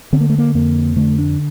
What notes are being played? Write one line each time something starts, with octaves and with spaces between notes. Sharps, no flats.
D3 C4
A#3
A3
A#3
F2 A#3
D3 A3
D4